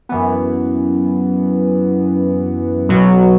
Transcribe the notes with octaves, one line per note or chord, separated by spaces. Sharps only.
F#2 E3 B3
B1 B2 F#3